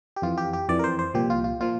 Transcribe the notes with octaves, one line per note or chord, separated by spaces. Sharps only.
G4
F2 E3 F4
G4
G4
F2 E3 D5
A#4
C5
C5
C2 A#2 F3 G4
F4
F4
A#2 F3 F4